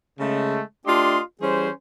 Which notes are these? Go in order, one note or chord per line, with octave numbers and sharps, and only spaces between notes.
C#3 G#3 A3
A3 D4 F4 G4 D#5 C6
E3 G3 C#4 G#4 C5